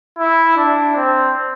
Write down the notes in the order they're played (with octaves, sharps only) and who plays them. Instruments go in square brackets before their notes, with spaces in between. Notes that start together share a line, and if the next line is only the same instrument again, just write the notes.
[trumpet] E4
D4
C4